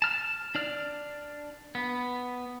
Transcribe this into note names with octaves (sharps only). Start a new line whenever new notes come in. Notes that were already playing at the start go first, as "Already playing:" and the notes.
A5 F6
D4 D5 F6
B3